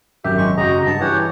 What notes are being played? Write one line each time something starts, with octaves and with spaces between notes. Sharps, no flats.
G#1 F#2 G4 E5
G#3 C#6
C#3 F#4 D#5 A#5
G2 A5
E3 G4 C#5 F#5